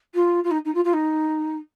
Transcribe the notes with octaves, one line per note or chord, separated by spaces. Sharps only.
F4
F4
D#4
D#4
F4
F4
D#4